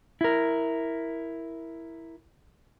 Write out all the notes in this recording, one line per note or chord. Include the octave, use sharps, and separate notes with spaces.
E4 A#4